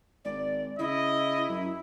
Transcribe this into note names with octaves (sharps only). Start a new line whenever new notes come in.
G#1 D5
C#3 E4 D#5
F#2